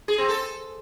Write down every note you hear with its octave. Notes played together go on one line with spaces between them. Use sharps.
G#4
C4
A4